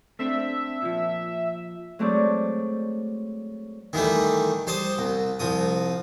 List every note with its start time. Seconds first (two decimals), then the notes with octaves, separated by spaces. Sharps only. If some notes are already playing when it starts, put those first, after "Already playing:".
0.19 A3 C4 D4 E5
0.82 A#2 F3
1.99 F#3 G#3 A3 C4 C#5 D5
3.93 D#3 E3 G3 A3
4.67 G3 C5 A5 D#6
4.99 C2
5.40 C2 F3 D#6